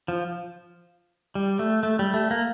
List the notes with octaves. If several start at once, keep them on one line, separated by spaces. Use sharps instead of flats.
F3
G3
A3
A3
G3
A3
A#3